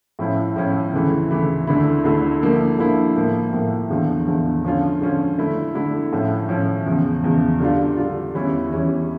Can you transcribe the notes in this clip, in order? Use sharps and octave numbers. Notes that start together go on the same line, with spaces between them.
A2 F3 C#4 E4
A2 F3 C#4 E4
D2 C#3 E3 A3 E4
D2 C#3 E3 A3 E4
D2 D3 A3 E4
D2 D3 A3 E4
D3 F3 A#3 E4
D3 F3 A#3 E4
A2 F3 A#3
A2 F3 A#3
E2 D3 F3
E2 D3 F3
D3 F3 C#4 F4
D3 F3 C#4 F4
D3 A3 E4
D3 A3 E4
A2 F3 C#4
A2 F3 C#4
E2 C#3 F3
E2 C#3 F3
D3 G3 D4 F4
D3 G3 D4 F4
E2 E3 G3 C#4 E4
E2 E3 G3 C#4 E4